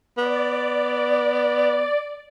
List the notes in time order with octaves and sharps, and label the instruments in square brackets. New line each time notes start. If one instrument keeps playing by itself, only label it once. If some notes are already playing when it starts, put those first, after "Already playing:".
[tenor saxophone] B3 [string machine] D5